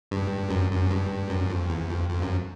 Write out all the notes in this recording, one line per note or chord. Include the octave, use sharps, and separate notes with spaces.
G2
F#2
F#2
G2
F#2
F2
E2
F2
F2
F#2